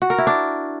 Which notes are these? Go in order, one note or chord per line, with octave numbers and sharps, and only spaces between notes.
F#4
A#4
E4
D4